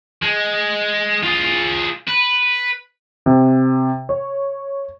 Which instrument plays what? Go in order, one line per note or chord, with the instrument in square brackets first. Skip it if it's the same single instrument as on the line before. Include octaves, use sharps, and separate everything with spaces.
[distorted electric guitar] G#3
F4 G#4
B4
[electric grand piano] C3
C#5